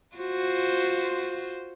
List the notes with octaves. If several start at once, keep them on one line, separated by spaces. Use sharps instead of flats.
F4 F#4 C5